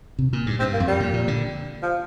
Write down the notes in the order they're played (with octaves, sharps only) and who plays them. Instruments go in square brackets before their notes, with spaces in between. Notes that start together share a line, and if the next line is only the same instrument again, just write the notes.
[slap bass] C3
A#2
G2
[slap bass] G2 [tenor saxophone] C4
[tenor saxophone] A#3
[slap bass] F2
[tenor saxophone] G3
[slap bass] A#2
A#2
D3
[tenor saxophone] F3